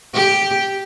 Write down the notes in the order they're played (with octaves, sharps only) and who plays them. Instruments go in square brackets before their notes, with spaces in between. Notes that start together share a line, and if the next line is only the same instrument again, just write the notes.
[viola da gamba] G4